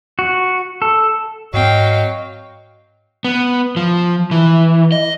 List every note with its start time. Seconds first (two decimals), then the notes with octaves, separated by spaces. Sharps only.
0.19 F#4
0.82 A4
1.54 G#2 F#3 C4 D#5 F5 G5
3.25 B3
3.76 F3
4.31 E3
4.92 D#5